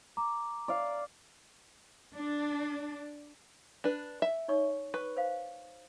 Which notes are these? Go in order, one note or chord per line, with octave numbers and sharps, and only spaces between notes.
A#5 D6
D5 F5
D4
D4 B4
E5
D#4 C#5 C#6
B4 C#6
C5 F5